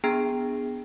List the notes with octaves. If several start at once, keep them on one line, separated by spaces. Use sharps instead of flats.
B3 D4 G#4 G5 A#5